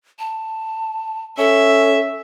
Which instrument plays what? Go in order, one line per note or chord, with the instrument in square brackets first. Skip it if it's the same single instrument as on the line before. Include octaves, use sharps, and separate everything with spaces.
[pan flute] A5
[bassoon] C#4 [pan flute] A4 [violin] E5